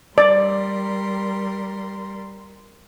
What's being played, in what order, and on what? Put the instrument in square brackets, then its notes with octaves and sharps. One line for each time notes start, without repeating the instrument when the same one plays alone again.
[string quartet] G3 A#4 C6 [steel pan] D5